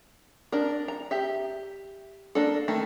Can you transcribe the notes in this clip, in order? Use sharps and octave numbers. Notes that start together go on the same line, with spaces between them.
D4 A#4
A#5
G4 E5
A#3 D4 A4
D#3 A3